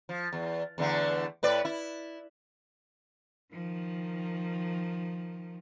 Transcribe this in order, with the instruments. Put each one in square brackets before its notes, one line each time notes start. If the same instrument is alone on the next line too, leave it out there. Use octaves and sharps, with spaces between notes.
[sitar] F3
E2
E2 D3 A3
A2 B4 D5
E4
[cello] D#3 F3